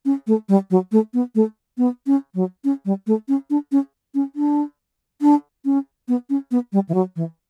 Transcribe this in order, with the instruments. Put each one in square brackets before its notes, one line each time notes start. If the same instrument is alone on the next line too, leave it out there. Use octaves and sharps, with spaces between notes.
[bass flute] C#4
A3
G3
F#3
A3
B3
A3
B3
C#4
F#3
C#4
G3
A3
C#4
D4
C#4
C#4
D4
D4
C#4
B3
C#4
B3
G3
E3
F#3
E3